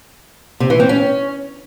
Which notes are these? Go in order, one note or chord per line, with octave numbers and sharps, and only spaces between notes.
C3
E3
C4
C#4